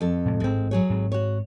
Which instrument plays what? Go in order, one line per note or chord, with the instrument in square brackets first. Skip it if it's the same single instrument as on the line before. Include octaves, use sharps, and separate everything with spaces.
[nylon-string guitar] F2 A4
[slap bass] A2 C3 G#3
[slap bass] A1 G#2 [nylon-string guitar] G#3 C4
[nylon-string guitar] F#3 G#4 C#5
[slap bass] G#2 C4
[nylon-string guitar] F#4 C#5